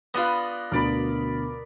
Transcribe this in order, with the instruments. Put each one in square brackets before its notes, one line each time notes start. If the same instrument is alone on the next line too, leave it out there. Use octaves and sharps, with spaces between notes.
[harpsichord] B3 F4 [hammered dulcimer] B4 D5 D#5
[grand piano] D2 B2 D3 [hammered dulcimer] A#4 D5 B5